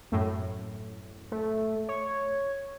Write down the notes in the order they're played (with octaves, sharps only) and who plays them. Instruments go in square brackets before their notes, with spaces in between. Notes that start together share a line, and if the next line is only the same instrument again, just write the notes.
[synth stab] F#2 A2
[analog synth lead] A3
C#5